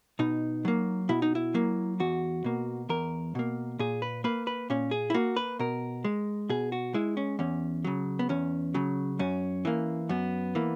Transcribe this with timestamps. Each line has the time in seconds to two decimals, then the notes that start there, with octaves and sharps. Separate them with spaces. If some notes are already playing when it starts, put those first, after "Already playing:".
0.19 B2 D#4
0.65 F#3 A#3
1.09 B2 E4
1.22 D#4
1.35 E4
1.54 F#3 A#3
2.00 E2 F#4
2.44 B2 A#3
2.89 E2 A#4
3.35 B2 A#3
3.79 A#2 G#4
4.02 B4
4.24 A#3 B4
4.47 B4
4.70 A#2 C#4
4.91 G#4
5.10 E4
5.14 A#3 F#4
5.36 B4
5.59 B2 A#4
6.04 G#3
6.49 B2 G#4
6.72 F#4
6.94 G#3 E4
7.17 C#4
7.39 E2 C#4
7.85 C#3 F#3
8.19 B3
8.29 E2 C#4
8.74 C#3 F#3
9.19 F#2 C#4
9.65 E3 A#3
10.09 F#2 B3
10.55 E3 A#3